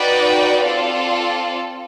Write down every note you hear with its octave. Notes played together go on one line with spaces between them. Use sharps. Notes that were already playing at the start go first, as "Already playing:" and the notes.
Already playing: D#4 F#4 B4 D5 G5
C4 F4 A4 D5 F5